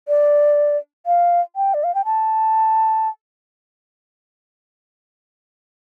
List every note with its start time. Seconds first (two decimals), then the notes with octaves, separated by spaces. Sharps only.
0.08 D5
1.06 F5
1.56 G5
1.74 D5
1.84 F5
1.95 G5
2.05 A5